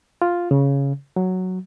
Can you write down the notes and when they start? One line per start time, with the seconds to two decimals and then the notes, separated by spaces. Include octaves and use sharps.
0.22 F4
0.51 C#3
1.16 F#3